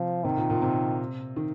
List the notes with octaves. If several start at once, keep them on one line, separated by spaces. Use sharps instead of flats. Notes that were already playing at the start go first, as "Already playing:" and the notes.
Already playing: C3 F3
C3 D#3
A#2
A#2
C3
D#3